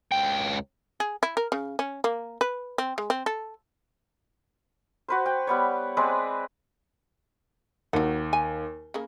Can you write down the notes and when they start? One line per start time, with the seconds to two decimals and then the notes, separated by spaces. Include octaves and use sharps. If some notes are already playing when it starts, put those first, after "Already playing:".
0.12 C#2 G5
1.00 G#4
1.23 E4
1.37 A#4
1.52 C#3
1.79 C#4
2.04 A#3
2.41 B4
2.78 C4
2.98 G#3
3.10 C4
3.26 A4
5.08 F#4 B4 C5
5.26 G5
5.47 G3 B3 C#5
5.97 G#3 C4 B4 D5
7.93 D#2 F#3 F#5
8.33 G#5
8.94 C#3 A#3